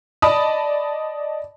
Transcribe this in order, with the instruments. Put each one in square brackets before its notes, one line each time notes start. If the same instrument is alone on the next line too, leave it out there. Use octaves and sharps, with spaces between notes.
[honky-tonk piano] D5 D#5 A5 B5 D#6